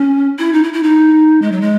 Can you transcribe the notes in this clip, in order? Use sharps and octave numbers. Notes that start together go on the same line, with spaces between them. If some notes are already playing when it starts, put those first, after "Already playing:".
Already playing: C#4
E4
D#4
E4
E4
D#4
G#3
F#3
G#3